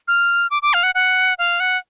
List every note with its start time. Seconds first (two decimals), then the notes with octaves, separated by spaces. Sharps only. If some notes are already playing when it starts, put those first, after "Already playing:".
0.08 F6
0.51 D6
0.62 D6
0.74 F5
0.83 F#5
0.95 F#5
1.38 F5
1.60 F#5